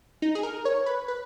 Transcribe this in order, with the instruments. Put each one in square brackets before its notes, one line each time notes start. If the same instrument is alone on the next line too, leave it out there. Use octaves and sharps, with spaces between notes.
[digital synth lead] D#4
G#4
A#4
C#5
B4
B4